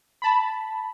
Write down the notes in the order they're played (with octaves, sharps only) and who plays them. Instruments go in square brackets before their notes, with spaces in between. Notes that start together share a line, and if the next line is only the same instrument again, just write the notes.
[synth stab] A5 B5